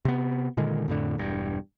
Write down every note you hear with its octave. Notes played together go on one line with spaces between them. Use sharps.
C3 B3
A#2 D3 D#3 G#3
F2 A2 D3
E1 G2